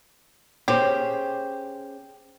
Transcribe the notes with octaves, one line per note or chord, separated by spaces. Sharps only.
C#4 G4 G#4 C5